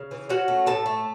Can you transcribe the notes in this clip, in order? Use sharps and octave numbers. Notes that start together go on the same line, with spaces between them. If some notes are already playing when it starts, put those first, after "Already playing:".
Already playing: C#3
E3
C#4 F#4 F#5
A3
A2 A4 A5
A3